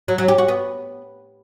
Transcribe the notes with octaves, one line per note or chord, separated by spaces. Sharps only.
F#3
F#3
G4
F#4
B3